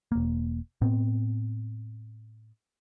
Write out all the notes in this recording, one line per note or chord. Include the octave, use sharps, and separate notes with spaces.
E1 A#3
A2 B3 C4